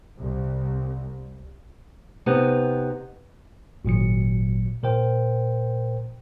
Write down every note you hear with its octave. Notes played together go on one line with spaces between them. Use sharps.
C2
C3 B3 D#4
G#1 A#2 F#3 C#7
A#2 A#4 C5 G5